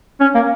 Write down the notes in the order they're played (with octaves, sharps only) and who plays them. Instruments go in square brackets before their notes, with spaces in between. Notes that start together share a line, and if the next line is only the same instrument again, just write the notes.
[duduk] C#4
A#3